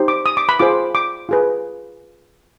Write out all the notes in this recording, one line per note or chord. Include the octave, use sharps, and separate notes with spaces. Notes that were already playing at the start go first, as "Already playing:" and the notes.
Already playing: D#4 G4 C5
D6
D#6
D6
B5
F4 G#4 C5 D6
D6
F4 G#4 B4